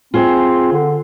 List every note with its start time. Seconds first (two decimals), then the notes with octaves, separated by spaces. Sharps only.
0.14 C4 F4 G#4 C5
0.72 D3